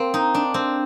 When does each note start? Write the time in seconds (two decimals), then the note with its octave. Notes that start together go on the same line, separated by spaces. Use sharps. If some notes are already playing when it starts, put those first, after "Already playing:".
Already playing: A#3 C4
0.14 D#4
0.34 D4
0.54 C4